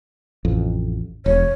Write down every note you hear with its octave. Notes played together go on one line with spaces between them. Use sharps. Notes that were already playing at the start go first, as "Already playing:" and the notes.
A1 F2
E1 C#5